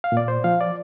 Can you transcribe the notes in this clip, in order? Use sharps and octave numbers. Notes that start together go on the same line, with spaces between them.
F5
A#2 D5
C5
F3 F5
D5